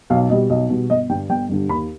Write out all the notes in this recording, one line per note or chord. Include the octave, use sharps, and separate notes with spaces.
B1 F5
B2 G3 D#5
B1 D#5
B2 G3
G1 D#5
G2 D3 G3 G5
G1 G5
G2 D3 G3
D#2 B5